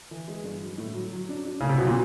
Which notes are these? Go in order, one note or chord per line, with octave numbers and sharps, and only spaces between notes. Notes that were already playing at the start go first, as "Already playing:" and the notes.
E3
G#3
G2
F#3
A2
F#3
F#3
D4
D4
A2 C#3
C3
B2 F#3
A#2